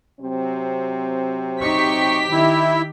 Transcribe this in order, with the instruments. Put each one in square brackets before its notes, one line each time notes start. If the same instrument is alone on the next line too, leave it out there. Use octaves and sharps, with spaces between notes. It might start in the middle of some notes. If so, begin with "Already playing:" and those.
[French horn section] C3 F#3 C4
[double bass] D#4 [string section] G4 B6 [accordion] C#6
[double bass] D#3 [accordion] E4